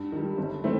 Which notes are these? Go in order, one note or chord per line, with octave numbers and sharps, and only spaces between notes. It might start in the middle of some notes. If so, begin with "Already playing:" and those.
Already playing: G2
D#3 G3
G1
D#3 A3 C4